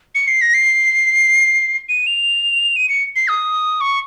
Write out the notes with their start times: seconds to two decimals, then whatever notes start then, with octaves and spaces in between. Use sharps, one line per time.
0.15 C#7
0.28 C7
0.41 A#6
0.54 C7
1.89 D#7
2.07 F7
2.76 D#7
2.89 C#7
3.16 C7
3.28 D#6
3.81 C#6